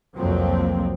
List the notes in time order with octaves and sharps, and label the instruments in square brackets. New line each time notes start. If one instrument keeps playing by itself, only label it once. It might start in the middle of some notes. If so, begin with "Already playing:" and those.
[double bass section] C2 F2 F3 F#3 A#3 C4